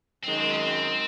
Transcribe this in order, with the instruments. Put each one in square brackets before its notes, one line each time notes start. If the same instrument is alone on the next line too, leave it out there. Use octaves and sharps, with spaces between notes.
[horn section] F#2 D#3 G#3 [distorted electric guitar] C4
[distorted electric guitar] C4
C#4
C4